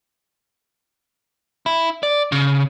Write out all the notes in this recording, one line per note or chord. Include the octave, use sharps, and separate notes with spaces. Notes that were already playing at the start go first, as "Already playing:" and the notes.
E4
D5
C#3